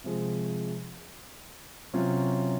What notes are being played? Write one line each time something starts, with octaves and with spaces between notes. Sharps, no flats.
C3 F3 G#3
C3 F#3 C#4 F4